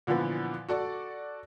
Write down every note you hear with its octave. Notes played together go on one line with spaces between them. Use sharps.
A#2 D3 E3 F3 B3
F#4 A4 D5 C#6